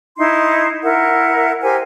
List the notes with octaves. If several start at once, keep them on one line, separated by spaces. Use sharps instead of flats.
D#4 E4 C6
E4 A#4 F#5
G4 A#4 C5 G#5